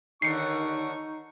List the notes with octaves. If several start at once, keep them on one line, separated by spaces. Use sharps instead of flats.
D#2 D3 D#4 C#6 C7 C#7